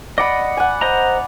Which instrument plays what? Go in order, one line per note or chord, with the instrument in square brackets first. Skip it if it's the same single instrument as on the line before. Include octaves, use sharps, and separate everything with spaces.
[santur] D5 B5 [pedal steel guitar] D#5 F#5
[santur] F#5 G#5
[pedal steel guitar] C5 D#5 A#5